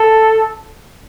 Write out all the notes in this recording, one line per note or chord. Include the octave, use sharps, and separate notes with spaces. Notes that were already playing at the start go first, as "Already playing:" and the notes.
Already playing: A4